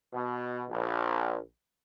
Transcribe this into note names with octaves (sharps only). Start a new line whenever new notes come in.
B2
A#1